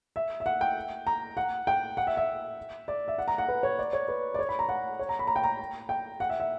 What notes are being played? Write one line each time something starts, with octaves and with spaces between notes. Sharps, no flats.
E5
E5
F#5
G5
A#5
F#5
G5
F#5
E5
E5
D5
E5
F#5
A#5
F#5
B4
C#5
D5
C#5
B4
D5
C#5
B5
A#5
F#5
C#5
A#5
B5
A#5
G5
A#5
G5
F#5
E5
E5